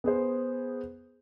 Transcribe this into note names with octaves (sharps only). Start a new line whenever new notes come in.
B3 G#4 C5